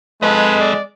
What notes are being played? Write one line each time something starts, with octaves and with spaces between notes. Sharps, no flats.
G#3 A4 B4 D#5
D5